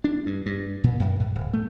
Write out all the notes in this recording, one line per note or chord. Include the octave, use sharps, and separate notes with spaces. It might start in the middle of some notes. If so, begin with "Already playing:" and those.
D4
G2
G2
A#2
F#2
G#2
D1
A3